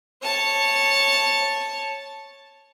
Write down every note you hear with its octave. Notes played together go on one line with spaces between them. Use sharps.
C#5 A5